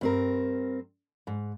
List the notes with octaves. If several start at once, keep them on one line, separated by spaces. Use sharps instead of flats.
G2 C4 A#4
G#2